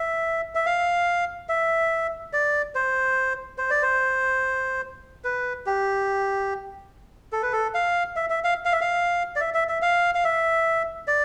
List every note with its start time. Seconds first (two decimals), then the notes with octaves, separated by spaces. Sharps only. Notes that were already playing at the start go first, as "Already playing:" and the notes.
Already playing: E5
0.55 E5
0.66 F5
1.49 E5
2.33 D5
2.75 C5
3.58 C5
3.70 D5
3.82 C5
5.24 B4
5.66 G4
7.32 A4
7.42 B4
7.52 A4
7.74 F5
8.16 E5
8.30 E5
8.44 F5
8.65 F5
8.72 E5
8.81 F5
9.36 D5
9.41 E5
9.54 E5
9.69 E5
9.82 F5
10.15 F5
10.24 E5
11.07 D5